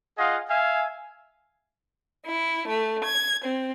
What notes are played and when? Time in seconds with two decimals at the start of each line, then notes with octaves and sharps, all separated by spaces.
0.18 F4 G#4 D#5 F5 F#5
0.50 E5 F5 G#5
2.26 E4
2.67 A3
3.03 G#6
3.43 C4